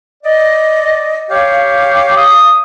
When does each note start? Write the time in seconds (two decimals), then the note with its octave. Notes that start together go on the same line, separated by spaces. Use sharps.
0.24 D5 D#5
1.30 G4 C#5 F5
2.17 D#6